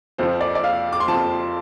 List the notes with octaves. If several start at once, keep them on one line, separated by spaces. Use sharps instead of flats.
F2 F3 C5
D5
D5
F5
D6
C6
F2 F3 A5